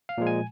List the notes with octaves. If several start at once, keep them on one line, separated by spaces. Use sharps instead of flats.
F5
A#2 F3 G#3
G#5